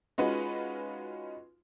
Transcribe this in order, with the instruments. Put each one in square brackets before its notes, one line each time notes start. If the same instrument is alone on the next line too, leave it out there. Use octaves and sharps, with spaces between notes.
[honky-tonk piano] G#3 C#4 D#4 F4 F#4 B4